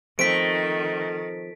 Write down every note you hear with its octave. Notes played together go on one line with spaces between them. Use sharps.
D#3 F3 A3 C4 C5 B6 D7